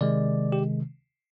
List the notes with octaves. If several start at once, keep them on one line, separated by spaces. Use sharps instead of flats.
C3 D#3 G#3 D5
G4